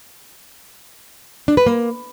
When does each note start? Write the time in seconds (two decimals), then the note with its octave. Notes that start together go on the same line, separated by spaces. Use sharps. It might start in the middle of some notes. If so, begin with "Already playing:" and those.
1.48 D4
1.57 B4
1.67 A#3